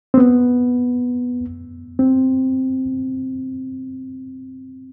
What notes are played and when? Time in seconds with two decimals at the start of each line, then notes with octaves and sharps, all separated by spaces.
0.14 C4
0.18 B3
1.99 C4